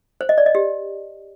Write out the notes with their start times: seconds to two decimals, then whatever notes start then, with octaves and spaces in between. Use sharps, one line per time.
0.21 C5
0.29 D#5
0.38 D5
0.46 D#5
0.55 G4